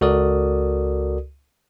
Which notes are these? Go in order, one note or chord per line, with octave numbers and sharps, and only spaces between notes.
C#2 F#4 A4 A#4 D5 D#6